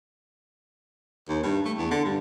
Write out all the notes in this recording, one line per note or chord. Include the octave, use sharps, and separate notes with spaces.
D#2
G2
A3
E2
D3
G2